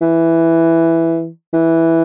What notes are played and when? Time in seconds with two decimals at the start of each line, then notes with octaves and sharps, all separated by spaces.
0.01 E3
1.53 E3